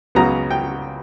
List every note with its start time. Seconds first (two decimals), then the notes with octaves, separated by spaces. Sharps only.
0.15 C#2 C#3 F#3 B3 A#5
0.51 G5